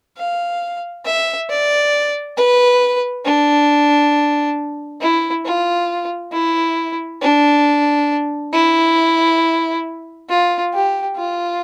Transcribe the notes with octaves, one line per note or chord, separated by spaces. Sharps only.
F5
E5
D5
B4
D4
E4
F4
E4
D4
E4
F4
G4
F4